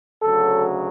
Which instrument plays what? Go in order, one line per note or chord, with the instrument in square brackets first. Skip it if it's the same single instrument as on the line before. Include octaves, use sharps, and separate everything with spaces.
[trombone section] D2 C#3 F#3 A4